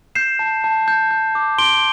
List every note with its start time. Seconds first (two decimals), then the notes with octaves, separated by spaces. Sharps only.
0.15 G6 C7 E7
0.39 A5
0.64 A5
0.88 G6
1.11 G6
1.35 D6
1.58 C6 D7 G7